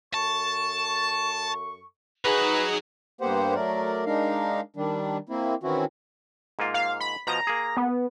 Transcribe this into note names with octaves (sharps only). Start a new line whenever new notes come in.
F#2 A4 A5 C#6
F#3 D#4 G#4 B4
G2 A#3 B3 G4 C5 F#5
F#3 A3 A#4 D5
G#3 D4 D#4 A#4 F5
D#3 G3 D4
A#3 C4 E4
D#3 E3 C4 C#4 E4 F#4
G#2 A#3 F4
F5
B5
B2 F3 D#5 A#5
A#3 G#4
B3